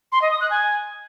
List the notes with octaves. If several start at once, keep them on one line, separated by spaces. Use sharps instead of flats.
C6
D#5
D#6
F#6
G#5